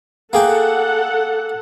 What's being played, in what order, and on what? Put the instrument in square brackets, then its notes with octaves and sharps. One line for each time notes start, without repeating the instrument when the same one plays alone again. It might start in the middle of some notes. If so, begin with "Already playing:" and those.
[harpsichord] A#3 G#4 G5 [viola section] A4 F#5